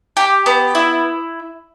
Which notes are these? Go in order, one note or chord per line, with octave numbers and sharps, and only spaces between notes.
G4
B3
E4